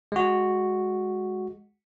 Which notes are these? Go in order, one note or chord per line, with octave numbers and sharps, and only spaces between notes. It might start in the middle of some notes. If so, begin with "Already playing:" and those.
G#3 F#4